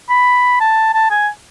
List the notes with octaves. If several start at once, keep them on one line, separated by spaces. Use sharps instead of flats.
B5
A5
A5
G#5